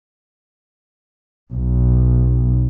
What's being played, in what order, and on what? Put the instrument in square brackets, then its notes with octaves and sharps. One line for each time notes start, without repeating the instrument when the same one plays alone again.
[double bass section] B1